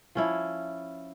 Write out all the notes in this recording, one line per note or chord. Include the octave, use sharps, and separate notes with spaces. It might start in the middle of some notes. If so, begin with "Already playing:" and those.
F3 C#4 E4